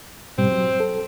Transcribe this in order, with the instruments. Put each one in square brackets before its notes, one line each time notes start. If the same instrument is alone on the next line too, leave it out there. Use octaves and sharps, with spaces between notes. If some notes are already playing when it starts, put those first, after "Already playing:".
[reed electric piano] G#2 B2 G3 [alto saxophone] C4
[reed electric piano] F#3
A4